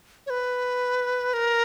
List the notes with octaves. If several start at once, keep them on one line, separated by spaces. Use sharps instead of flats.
C#5
B4
A#4